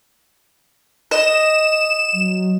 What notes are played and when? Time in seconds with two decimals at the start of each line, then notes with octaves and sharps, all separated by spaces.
1.11 D#5 E7
2.14 F#3